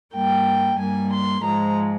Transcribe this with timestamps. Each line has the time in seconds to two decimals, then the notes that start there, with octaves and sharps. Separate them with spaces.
0.14 G2 G3 A#3 G5
0.78 G2 G3 A#3 G#5
1.11 C6
1.43 G#2 F3 G#3 A#5